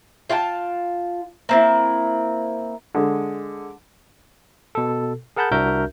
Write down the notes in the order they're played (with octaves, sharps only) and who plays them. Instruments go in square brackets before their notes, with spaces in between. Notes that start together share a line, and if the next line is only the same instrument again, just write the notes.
[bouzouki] F4 F5 G5 A5
A#3 C4 E4
[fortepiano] D3 G#3
[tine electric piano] B2 A4
G#4 A#4 F#5 A5 B5 G6
C2 D4 F#4 A#4 E5 G6